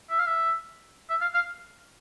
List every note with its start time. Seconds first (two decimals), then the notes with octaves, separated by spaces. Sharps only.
0.10 E5
0.19 F5
0.26 E5
1.10 E5
1.21 F5
1.34 F5